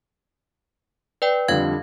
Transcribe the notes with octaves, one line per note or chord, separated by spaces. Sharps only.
B4 D5 G5
F2 D3 G3 F5 G#6